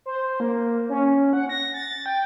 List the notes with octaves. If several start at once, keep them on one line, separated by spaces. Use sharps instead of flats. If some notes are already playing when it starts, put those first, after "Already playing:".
C5
A#3
C#4
F#5
A#6
A6
G5